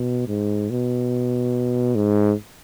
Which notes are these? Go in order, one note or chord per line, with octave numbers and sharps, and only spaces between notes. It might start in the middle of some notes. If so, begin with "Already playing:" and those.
Already playing: B2
G#2
B2
G#2